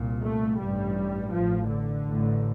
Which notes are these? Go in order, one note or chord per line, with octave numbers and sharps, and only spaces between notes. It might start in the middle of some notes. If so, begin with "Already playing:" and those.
Already playing: C2 A#2
A3
A1 G2 G3
A1 A2 F3
D3
A1 A2